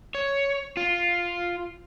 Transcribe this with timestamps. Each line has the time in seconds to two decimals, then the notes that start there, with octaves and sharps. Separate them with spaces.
0.15 C#5
0.77 F4